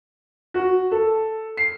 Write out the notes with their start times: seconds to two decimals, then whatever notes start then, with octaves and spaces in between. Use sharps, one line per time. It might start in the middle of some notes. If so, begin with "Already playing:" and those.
0.54 F#4
0.91 A4
1.57 C7